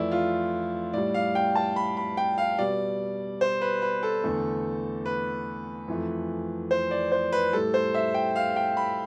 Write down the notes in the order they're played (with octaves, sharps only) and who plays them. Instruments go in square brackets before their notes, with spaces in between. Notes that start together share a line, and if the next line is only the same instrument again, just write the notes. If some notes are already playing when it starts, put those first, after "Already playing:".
Already playing: [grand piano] F2 E3 A3 E4 D5
F4
A2 G3 D5
F5
G5
A5
B5
B5
G5
F5
B2 G3 D5
C5
B4
B4
A4
E2 D3 A3
B4
F2 E3 A3
C5
D5
C5
B4
A2 G3 A4
C5
E5
G5
F5
G5
B5